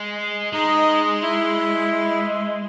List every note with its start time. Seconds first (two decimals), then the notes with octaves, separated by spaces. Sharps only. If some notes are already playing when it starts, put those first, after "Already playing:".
Already playing: G#3
0.53 G#3 D#4
1.22 E4